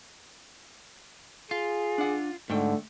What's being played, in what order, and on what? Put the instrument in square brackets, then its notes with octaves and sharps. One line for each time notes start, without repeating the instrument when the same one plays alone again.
[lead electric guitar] F4 [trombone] G#4
[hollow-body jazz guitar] D4 F#5
[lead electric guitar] G#2 [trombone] D3 [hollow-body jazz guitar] A3 G5